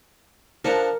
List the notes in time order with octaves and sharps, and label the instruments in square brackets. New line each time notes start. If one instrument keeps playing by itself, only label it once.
[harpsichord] F3 D4 F#5 [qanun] A#4